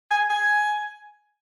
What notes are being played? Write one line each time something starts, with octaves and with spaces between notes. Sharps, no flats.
G#5
G#5